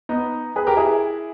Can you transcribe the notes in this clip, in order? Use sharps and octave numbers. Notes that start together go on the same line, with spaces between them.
B3 D#4
G#4 B4
G4 A#4
E4 G#4